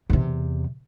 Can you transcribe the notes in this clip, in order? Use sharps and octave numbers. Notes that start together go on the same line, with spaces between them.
E2 C3